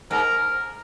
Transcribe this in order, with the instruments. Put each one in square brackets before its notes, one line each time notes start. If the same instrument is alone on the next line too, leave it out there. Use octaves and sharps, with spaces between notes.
[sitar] G#2 [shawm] A#4